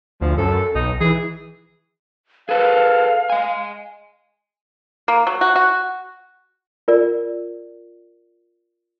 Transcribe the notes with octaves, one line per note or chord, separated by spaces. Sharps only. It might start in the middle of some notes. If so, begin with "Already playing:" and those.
D2 F3
F#2 A4
B1 D#4
E3 G#4
G#4 A4 B4 F5
D#5 G#5
A#3
F#3
F#4
F#4
F4 A#4 D5